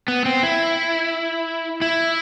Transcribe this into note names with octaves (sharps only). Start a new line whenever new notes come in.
B3
C4
E4
E4